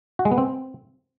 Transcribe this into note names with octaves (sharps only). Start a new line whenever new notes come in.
F#4
G#3
B3
C4